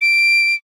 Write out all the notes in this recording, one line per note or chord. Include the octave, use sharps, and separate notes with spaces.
D7